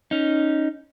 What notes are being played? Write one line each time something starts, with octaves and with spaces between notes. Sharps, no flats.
C#4 D#4